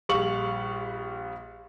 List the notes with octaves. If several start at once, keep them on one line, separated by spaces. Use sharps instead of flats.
A#1 G3 F5 C#6 F#7